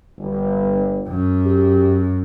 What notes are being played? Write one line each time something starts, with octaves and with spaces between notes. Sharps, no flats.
G1
F#2
G4